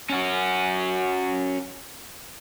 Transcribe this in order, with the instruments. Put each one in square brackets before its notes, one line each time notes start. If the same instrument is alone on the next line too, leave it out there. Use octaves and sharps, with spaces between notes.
[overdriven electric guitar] C#4 F#4